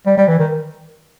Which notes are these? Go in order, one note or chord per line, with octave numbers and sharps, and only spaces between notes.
G3
G3
E3
D#3